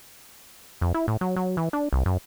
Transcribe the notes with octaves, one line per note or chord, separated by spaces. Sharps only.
F2
E4
A2
F#3
F#3
E3
D4
C2
F#2